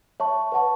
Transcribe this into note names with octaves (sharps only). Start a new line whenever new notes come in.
C#5 E5 A5 C#6
B4 F#5 A5 C#6